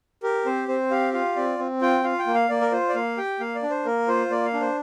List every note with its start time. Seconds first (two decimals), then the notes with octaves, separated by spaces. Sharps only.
0.23 G4 A#4
0.46 C4 C5
0.68 C4 C5
0.91 G4 F5
1.13 F4 F5
1.36 C4 D5
1.59 C4
1.81 F4 G5
2.04 F4 F5
2.19 G5
2.27 A#3
2.34 F5
2.49 A#3 D5
2.61 A#4
2.72 F4 C5
2.89 D5
2.95 A#3 F5
3.18 G4 G5
3.40 A#3 F5
3.55 D5
3.63 D4
3.70 C5
3.85 A#3 A#4
4.08 F4 C5
4.30 A#3 D5
4.45 F5
4.54 D4
4.61 C5